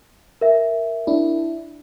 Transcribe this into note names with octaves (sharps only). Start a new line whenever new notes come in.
A#4 E5
D4 E4